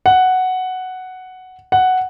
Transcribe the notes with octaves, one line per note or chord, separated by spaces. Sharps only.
F#5
F#5